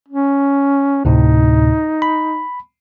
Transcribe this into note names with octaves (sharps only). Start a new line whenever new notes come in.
C#4
D2 A2 C3 D#4
B5